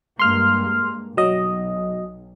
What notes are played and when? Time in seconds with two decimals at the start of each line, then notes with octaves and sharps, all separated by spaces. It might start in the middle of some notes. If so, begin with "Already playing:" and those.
0.19 G2 G#3 A#3 C6 F6
1.17 B1 F#3 D#5